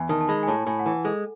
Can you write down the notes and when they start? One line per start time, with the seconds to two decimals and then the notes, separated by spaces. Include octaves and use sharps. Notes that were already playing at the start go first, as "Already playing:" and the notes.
Already playing: E2 E5 G#5
0.09 D#3 A5
0.21 A5
0.29 G#3 B5
0.43 G#5
0.48 A2 A5
0.66 A2 G#5
0.79 F#5
0.86 E3 G#5
1.05 G#3 A4